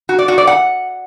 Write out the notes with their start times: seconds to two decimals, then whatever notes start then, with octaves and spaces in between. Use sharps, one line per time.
0.09 F#4
0.19 D5
0.28 F#4
0.38 D5
0.47 F#5